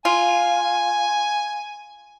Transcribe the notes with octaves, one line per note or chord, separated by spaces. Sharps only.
F4 G#5